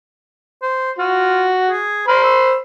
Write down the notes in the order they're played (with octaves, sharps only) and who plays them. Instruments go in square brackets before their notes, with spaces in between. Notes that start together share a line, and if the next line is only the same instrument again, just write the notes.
[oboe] C5
[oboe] F4 [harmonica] F#4
[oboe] G#4
[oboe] A#4 [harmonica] C5 B5 C6
[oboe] E6